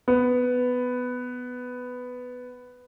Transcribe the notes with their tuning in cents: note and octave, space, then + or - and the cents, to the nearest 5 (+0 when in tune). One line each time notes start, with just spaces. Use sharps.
B3 +10